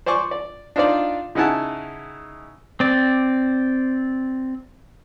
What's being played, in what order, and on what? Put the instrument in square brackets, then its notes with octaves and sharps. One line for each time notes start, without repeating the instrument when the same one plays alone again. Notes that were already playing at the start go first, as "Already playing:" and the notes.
[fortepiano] C5 D5 G#5 C#6 D6
D5
D4 D#4 F4 C5 D5
C#3 D#4 E4 F#5 G#5 A5
[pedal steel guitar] C4 D5